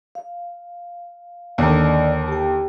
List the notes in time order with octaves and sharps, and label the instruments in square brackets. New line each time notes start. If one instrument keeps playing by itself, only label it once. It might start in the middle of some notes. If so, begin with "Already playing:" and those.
[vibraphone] F5
[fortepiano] D#2 D3 [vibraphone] D5 D#5
[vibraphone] G4 G5